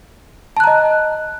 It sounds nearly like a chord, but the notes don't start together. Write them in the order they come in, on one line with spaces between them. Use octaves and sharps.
A5 F#6 A#5 D#5